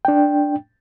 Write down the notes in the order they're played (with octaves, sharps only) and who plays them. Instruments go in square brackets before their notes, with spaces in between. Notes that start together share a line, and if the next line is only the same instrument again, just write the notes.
[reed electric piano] D4 G5